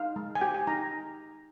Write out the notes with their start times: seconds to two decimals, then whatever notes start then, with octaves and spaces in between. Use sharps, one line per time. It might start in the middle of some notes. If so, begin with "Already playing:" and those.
Already playing: D#4 F5
0.16 G#3
0.35 G#5
0.41 G4 G5
0.54 G#5
0.67 D#4 A#5